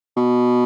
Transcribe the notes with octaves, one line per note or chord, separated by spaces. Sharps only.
B2